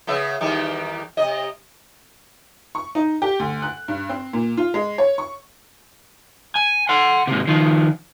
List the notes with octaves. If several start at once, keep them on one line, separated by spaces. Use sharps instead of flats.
C#3 B3 E5
E2 D#3 G3
C3 D#5
C#6
D#4
G4
D2
F#6
G2
C4
A#2
F4
G#3
C#5
C#6
G#5
F#5 C6
G#2 C3
D#3 F3